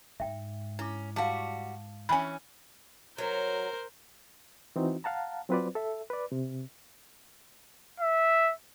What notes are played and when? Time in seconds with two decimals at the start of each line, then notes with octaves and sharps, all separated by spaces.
0.20 G#2 E5 G5
0.79 C#4 E4 D6
1.16 G3 F#4 F5 A5 D6
2.09 E3 C#4 G#5 B5
3.18 F#3 A#4 C5
4.76 E3 C4 D#4 F#4
5.04 F5 F#5 A5 A#5
5.49 F#3 C4 F4 B4 C5 D5
5.75 A4 E5
6.10 B4 D5
6.32 C3
8.00 E5